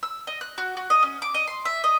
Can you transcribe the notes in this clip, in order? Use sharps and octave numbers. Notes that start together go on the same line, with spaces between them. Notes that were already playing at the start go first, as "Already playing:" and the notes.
E6
D#5
F#6
F#4
F#4
D#5
C#4
D6
D#5
C6
E5
D#5